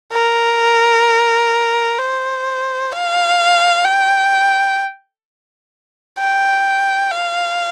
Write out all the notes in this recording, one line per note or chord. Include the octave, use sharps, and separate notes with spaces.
A#4
C5
F5
G5
G5
F5